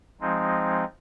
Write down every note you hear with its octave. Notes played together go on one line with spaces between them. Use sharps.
F3 G#3 C4 D#4